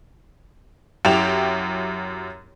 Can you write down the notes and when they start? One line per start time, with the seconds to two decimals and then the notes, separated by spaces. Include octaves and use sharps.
1.05 F#2 E4 G4 G5 E7 F7